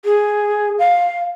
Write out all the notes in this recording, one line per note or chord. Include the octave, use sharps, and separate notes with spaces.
G#4
F5